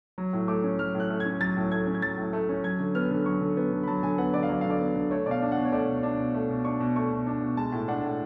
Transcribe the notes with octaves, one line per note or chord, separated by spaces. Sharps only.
F#3
A2
A3 D6
C#4
F#3 F6
A2
F#6
A3
G#6
C#4
F#3 A6
A2
A3 G#6
C#4
G#6
F#3 A6
A2
A3
C#4
F#3 G#6
D3
B3 F6
D3
F#3 C#6
D3
B3
D3
B5
F#3 A5
D3 G#5
B3 F#5
D3 D5
F5
F#3 D5
D3 F5
D5
B3
D3
A3 C#5
B2 D5
F5
D4
F#5
B2
C#5
A3 D5
B2
D4
B2
A3
B2
D4 C#6
B2
A3 C#6
B2
D4
B2
G#3 A5
A2
D4 F#5
A2